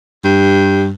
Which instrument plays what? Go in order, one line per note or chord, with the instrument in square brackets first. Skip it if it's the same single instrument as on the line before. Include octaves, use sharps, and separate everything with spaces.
[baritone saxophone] G2